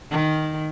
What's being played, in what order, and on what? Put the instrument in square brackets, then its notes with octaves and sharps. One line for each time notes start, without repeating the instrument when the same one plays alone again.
[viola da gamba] D#3